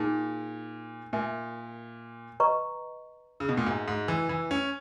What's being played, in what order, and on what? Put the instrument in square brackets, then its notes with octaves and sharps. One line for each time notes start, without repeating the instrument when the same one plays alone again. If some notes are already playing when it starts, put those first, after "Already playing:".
Already playing: [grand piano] A#2 [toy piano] D#4 G#4
[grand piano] A#2 [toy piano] A#4 E5 G#5
[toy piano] B4 D#5 A#5 C#6
[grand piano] C#3
B2
A#2
[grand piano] G#2 [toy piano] F#4 A#4 E5 G#5
[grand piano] G#2
E3
E3
C#4